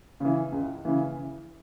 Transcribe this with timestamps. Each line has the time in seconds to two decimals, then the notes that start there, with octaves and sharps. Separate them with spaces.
0.20 C#3 E3
0.52 C#2
0.85 C#3 E3